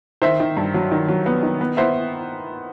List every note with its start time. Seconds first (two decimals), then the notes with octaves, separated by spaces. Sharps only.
0.22 D#3 C5 E5
0.40 D#3
0.57 G2
0.74 F#3
0.92 D#3
1.08 F#3
1.26 B3
1.43 D#3
1.61 B3
1.77 B3 C5 E5